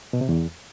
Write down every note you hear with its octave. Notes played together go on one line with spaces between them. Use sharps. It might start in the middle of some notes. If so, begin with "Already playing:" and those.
B2
C3
E2